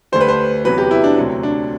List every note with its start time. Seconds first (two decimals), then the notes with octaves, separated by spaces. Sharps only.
0.12 D2 D3 G3 C5
0.21 B4
0.28 C5
0.65 E2 C3 F#3 B4
0.78 G4
0.91 E4
1.04 D4
1.17 D2 C3 F#3
1.43 D4